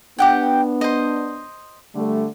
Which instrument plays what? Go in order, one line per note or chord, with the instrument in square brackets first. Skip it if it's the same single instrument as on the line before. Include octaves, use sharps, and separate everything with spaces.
[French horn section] B3 D4 [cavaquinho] G4 F#5 G5
[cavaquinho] C5 D#5
[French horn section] D3 G3 A3